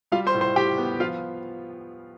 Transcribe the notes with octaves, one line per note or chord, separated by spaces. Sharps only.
G3 F4 F5
C5 C6
A2
C5 C6
A2 G4 G5
B3
F3 F4 F5